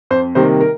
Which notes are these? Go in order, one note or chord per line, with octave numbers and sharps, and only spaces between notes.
F2 C5
C3 D#3 G3 A#3 C5
A#4